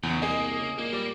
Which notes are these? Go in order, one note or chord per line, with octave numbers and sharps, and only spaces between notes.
B1 E2 C#3
C2 A#3 G#4 D#5
C#3
A#2 A#3
G3 D5